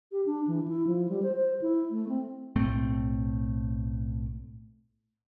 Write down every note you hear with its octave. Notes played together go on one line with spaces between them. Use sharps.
G4
D4
E3
E4
F3
G3
C5
C5
E4
A3
C4
B1 A2 A3 C4